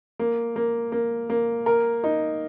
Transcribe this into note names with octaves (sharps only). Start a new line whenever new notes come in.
A#3
A#3
A#3
A#3
A#4
D#4